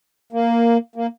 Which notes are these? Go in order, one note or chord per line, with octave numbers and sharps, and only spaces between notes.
A#3
A#3